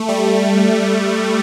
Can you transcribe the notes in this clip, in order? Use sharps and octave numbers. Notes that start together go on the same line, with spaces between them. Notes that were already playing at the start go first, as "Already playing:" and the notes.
Already playing: A3
G3